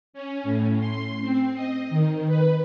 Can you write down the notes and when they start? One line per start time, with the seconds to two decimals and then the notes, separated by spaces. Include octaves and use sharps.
0.13 C#4
0.44 A2
0.79 C6
1.21 C4
1.54 D#5
1.90 D#3
2.27 B4